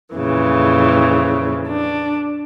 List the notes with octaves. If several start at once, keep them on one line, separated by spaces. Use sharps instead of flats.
F2 A#2 C#3 E3
D4